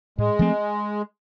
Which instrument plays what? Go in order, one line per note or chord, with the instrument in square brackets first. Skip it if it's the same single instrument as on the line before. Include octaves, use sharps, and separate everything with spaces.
[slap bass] A2 [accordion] G#3
[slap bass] F3 A3 C4